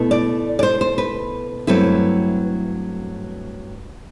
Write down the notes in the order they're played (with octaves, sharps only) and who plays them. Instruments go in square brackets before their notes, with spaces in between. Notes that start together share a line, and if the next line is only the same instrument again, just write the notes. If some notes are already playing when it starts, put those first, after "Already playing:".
Already playing: [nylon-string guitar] B2 A3 E4
D5
D5
C5
C5
B4
G2 F#3 A3 C4 E4 B4